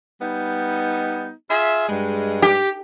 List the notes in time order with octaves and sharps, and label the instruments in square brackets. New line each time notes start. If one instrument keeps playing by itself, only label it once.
[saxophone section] G3 B3 D#4
F4 G#4 E5
G2 G#3
[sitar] G4